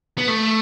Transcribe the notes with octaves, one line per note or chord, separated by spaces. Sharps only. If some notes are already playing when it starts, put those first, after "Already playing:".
B3
A3